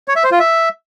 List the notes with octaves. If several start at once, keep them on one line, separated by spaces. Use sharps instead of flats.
C#5
E5
C5
F4
E5